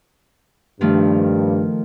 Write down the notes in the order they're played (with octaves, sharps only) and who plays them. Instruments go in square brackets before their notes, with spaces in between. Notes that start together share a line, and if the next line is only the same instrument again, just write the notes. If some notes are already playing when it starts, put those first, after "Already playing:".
[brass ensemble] G2 [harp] D#3 F3 A3